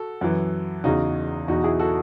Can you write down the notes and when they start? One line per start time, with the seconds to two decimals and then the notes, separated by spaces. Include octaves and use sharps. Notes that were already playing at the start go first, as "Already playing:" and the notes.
Already playing: F#4 A4
0.21 F#2 E3
0.84 E2 C#3 F#3 D#4 F#4
1.48 E2 B2 F#3 D#4 F#4
1.64 E4 G#4
1.79 F#4 A4